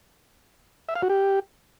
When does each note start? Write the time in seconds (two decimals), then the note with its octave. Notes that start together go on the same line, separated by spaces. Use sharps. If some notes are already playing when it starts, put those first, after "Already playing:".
0.89 E5
0.96 F5
1.02 F#4
1.09 G4